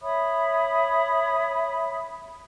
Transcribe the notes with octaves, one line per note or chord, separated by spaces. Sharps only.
C#5 E5 B5 D#6